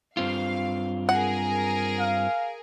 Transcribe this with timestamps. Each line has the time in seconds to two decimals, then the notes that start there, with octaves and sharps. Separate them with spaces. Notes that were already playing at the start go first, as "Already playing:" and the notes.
0.17 G2 C4 F4 F5
1.09 G#4 A#4 F#5
1.99 F5